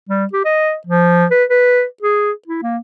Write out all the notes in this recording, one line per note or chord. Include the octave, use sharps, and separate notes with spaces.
G3
G4
D#5
F3
B4
B4
G#4
E4
A#3